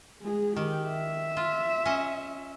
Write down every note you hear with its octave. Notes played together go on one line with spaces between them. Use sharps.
G#3 G#4
D#3 G4
E5
F4
C#4 D#5